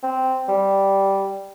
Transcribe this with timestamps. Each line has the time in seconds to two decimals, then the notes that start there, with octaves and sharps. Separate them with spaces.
0.03 C4
0.48 G3